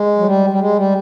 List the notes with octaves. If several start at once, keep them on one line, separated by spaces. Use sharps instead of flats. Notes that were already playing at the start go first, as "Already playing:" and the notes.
Already playing: G#3
F#3
G3
G3
G#3
G3